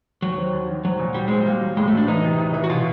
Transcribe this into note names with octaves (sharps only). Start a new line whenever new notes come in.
D#2 F#3
C4
D#2
D#3
F#3 C4
A#2
F#3 G3
G#3 C4
G3 A#3
F#3
A2 G#3
A3
F#3
D4
E3 D#4
C3
C3
E3
F#4
B2 F4